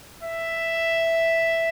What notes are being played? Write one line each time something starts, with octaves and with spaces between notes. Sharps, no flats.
E5